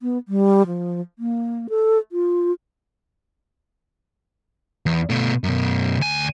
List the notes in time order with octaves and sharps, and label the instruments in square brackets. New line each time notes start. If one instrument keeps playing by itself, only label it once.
[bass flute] B3
G3
F3
A#3
A4
F4
[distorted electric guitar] E2
B2 A3
F#2 B2
D2 G#5